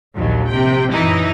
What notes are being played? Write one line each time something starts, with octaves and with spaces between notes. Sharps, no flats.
A#1 D#2 F#3
C3 G5
F#2 E3 D#4 E4